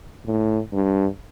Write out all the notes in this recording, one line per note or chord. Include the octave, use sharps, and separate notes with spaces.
A2
G2